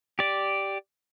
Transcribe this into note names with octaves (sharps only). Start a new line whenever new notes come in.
G4 D5